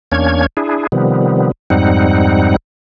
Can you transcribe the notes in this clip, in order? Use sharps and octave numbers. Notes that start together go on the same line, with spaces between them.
E2 A#3 C#4 D4 C#5 G#6
D4 E4 G#4
C3 D#3 F3 G3 B3
F2 G#2 G3 C4 D#4 F#5